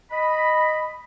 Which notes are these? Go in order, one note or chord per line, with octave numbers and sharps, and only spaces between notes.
D#5 B5